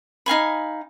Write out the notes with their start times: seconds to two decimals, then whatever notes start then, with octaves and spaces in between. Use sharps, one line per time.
0.26 D#4 F5 G#5 B5